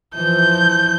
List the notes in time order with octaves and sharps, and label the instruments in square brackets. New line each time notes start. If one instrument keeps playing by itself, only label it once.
[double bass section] E3 F3 [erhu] G6